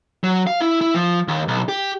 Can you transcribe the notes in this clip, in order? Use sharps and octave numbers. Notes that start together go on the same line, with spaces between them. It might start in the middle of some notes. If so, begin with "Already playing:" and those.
F#3
F5
E4
E4
F3
D#2
B1
G4